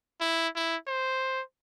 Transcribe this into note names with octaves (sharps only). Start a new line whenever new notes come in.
E4
E4
C5